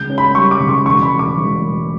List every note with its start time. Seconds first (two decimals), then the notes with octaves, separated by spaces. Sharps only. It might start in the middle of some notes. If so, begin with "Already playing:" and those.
Already playing: C#2 G6
0.10 C#4
0.18 B5
0.34 G3 C#6
0.51 D6
0.60 C#3
0.69 C#6
0.86 E1 C#6
1.03 B5
1.11 E1
1.19 D6
1.38 E1
1.62 E1